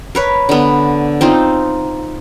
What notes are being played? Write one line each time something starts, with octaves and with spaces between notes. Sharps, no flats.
A#4 B4 C#5
D3 B3
C4 D#4 F4